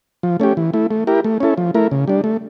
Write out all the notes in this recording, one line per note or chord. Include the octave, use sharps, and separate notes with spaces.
F3
A3 C#4 G4
E3
A3 E4
A3
E4 G4 A#4
A3
C#4 E4 A4
F3
A3 E4 A#4
C#3
G3 D4
A3